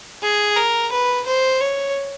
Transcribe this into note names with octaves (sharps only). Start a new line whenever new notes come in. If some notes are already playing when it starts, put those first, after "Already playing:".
G#4
A#4
B4
C5
C#5